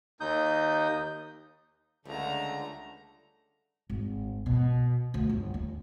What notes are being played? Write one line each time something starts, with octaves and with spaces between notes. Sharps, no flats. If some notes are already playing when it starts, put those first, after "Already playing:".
D#2 D#4 D#6 G6
C#2 D3 G3 A3 A#5
G#1
B2
D2
G1
D#2